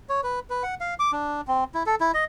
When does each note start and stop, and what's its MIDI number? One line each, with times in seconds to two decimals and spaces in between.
0.09 0.21 73
0.23 0.39 71
0.50 0.63 71
0.63 0.75 78
0.81 0.94 77
0.99 1.11 86
1.13 1.41 62
1.48 1.64 60
1.74 1.83 64
1.86 1.95 69
2.01 2.11 64
2.14 2.24 75